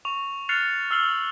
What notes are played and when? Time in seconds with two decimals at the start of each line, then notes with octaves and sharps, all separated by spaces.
0.05 C#6 F7
0.49 F6 F#6 A6 C7 C#7 F7
0.91 E6 F6 C7 F#7